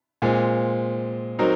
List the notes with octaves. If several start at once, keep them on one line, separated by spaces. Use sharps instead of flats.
A#2 G#3 C4
F#3 C4 D#4 A#4